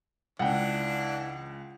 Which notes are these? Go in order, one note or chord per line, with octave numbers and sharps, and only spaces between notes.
C#2 E3 D4 F#5 G5